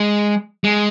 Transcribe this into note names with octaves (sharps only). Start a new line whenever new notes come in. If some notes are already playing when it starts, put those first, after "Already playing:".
Already playing: G#3
G#3